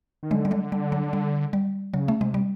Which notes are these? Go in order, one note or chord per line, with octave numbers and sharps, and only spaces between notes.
D#3
D3 F#3 G#3
G3
F#3 G#3
G3
F#3
G3
G3
C#3 F#3
A3
C3 G#3
G3